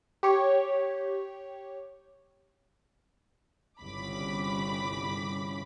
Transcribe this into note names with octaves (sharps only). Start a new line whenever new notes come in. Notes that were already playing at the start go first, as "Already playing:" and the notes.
G4 C#5
G1 C2 C#3 B5 D6 B6